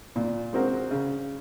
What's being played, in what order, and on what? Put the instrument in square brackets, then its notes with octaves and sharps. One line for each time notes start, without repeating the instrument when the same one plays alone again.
[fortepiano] A#2
G#3 C4 F#4 A#4
C#3